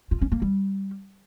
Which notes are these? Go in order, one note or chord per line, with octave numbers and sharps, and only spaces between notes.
F4
C#4
A#3
G3